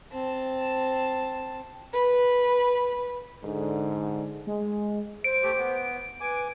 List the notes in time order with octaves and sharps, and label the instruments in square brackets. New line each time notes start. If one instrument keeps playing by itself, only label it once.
[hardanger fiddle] C4 A5
[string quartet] B4
[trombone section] G#2 D3
[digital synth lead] G#3
[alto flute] C5 [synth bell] D7
[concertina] A3 G4
B3
[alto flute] B4 [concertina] G#5 D6